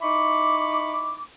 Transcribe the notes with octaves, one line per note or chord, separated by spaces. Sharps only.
D#4 E4 B5 C#6 D6